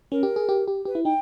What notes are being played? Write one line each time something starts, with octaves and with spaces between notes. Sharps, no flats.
C#4 A#4
G4
G#4
G4
G4
G4 B4
E4
D#4 G5